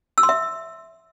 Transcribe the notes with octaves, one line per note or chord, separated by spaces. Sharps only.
E6
C6
E5